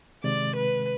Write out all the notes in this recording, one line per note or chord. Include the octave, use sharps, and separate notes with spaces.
C3 D#3 G#3 D5
B4